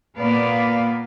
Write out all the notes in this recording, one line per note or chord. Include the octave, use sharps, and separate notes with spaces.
A#2 A#3 B3 B4 D5 F5